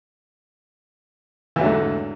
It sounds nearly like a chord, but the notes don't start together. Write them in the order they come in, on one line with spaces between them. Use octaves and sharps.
E3 E2 F#3 D3 G#2